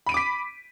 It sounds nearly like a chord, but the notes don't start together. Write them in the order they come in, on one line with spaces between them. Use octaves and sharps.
B5 D#7 D7 D6 B6